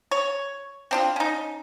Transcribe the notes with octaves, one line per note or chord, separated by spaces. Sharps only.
C#5
C4 D4 F4
C#4 D#4